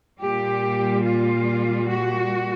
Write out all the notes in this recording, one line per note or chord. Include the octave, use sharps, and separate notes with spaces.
A#2 G3 G4
F4
F#4